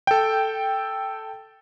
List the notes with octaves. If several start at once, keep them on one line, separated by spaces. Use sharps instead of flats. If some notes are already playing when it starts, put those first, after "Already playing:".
A4 G5